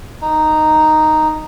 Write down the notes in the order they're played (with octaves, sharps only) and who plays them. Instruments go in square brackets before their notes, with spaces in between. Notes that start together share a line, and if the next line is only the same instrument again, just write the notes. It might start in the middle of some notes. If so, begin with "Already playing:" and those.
[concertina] D#4